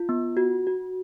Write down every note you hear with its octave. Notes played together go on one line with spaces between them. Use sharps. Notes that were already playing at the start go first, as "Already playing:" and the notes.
Already playing: F4
B3
F#4
F#4